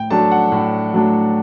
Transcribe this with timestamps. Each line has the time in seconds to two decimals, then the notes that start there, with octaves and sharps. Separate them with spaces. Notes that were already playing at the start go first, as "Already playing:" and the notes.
Already playing: A2 G5
0.10 F#3 A3 D4 A5
0.32 F#5
0.52 A2
0.93 F#3 A3 D4